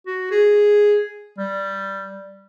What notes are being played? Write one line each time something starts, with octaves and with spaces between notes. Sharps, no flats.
F#4
G#4
G3